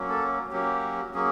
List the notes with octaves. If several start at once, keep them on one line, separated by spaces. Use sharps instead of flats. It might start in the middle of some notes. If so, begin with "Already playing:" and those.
Already playing: F#3 A#3 C#4
A4
F#3 A#3 C#4 G4
F#3 A#3 C#4 G#4